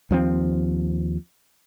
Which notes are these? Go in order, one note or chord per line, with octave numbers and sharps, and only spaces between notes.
D#2 F3 A#3 C4